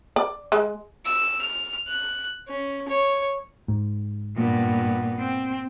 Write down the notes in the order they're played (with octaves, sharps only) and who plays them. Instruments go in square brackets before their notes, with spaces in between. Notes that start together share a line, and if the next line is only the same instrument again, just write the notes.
[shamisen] D5
G#3
[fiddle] E6
F6
F#6
C#4
C#5
[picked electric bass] G#2
[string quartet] G2 B3 [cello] A#2
[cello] C4